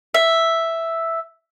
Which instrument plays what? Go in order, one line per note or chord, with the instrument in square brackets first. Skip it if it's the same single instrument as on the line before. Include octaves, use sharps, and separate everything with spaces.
[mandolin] E5